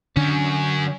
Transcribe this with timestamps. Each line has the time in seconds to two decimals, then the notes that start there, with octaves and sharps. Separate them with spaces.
0.16 F#2 D3 C#4 D4